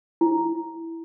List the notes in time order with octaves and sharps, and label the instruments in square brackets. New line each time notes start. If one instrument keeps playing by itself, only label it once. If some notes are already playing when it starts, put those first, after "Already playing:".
[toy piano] E4